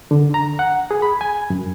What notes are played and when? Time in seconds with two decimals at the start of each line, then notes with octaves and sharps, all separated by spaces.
0.11 D3
0.34 A#5
0.59 F#5
0.91 G#4
1.02 B5
1.21 G#5
1.50 F#2